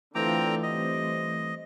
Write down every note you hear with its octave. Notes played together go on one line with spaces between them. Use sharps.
D3 E3 A3 C4 F4 G5 A#5 D6
G3 C4 D#5